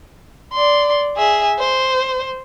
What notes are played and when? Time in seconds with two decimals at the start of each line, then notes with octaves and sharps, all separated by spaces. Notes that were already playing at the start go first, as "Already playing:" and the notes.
0.53 D5 C6
1.17 G#4 E5
1.59 C5